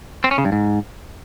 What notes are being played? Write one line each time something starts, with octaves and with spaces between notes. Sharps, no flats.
C4
C#4
C#3
G2
G#2